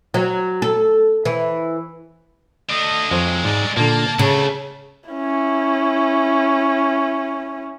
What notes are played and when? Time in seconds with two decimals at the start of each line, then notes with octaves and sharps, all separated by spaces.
0.14 F#3
0.62 A4
1.25 E3
2.70 A3 D4 D#5
3.11 F2 F#3 G#3 C5
3.44 G#2 D5
3.77 A#2 D3 A#3 A5
4.19 C#3 A3 C#4 D4
5.10 C#4 E4